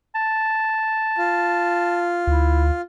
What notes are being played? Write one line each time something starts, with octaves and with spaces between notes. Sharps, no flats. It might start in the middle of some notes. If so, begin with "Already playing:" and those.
A5
F4
D2 E4